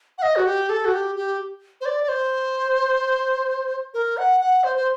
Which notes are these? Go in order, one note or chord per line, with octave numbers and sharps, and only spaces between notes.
F#5
D#5
F#4
G4
A4
F#4
G4
G4
C5
D5
D5
C5
A#4
F#5
F#5
C5
C5